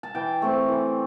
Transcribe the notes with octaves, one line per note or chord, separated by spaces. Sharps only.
A5
E3 G5
A3 C4
E3